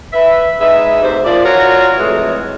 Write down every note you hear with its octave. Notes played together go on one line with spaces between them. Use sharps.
B4 E5
G#3 D#4 B4 E5
D2 G#2 C3 C5
A#2 F3 D5
F4 F#4 A#4 C#5
F2 E3 F#3 G#3 A3